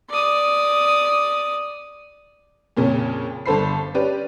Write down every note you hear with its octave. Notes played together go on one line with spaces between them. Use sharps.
D5 D#6
F2 A#2 C#3 C#4
G1 D4 A4 C5 B5 C7
C#4 G4 B4 D5